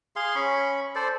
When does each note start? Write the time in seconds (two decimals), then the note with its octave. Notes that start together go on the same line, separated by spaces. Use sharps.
0.16 G#4 F5 C6
0.35 C#4 B5 C#6
0.95 A4 C5 D5